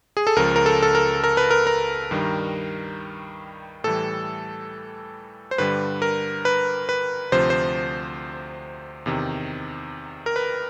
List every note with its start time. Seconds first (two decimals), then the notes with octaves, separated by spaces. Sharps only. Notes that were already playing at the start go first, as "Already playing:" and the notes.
0.17 G#4
0.27 A4
0.36 C#2 C#3 F3 A#4
0.56 A#4
0.66 A4
0.82 A4
0.95 A#4
1.24 A#4
1.37 B4
1.51 A#4
1.67 A#4
2.11 G2 D#3 G3
3.84 A2 E3 G3 A4
5.51 C5
5.58 G2 D3 G3 B4
6.02 A#4
6.45 B4
6.89 B4
7.32 D2 C3 F3 C5
7.50 C5
9.06 E2 C3 D#3
10.26 A#4
10.36 B4